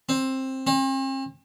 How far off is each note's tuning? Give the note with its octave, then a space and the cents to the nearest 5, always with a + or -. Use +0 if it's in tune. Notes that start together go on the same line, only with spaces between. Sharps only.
C4 +15
C4 +45